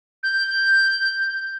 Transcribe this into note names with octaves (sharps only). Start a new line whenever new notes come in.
G6